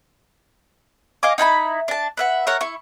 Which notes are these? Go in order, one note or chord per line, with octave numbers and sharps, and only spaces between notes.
D#5 F5 G#5 D6
D#4 E4 G5 B5
D4 A5
B4 E5 F#5
A#4 C#5 F#5
E4 C#6